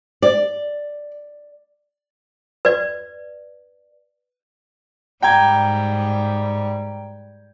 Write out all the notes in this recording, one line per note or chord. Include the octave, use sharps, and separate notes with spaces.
D5
B4 D5
G#2 G3 G5 A#5 G#6